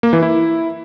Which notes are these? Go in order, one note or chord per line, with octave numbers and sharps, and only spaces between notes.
A#3
E3
E4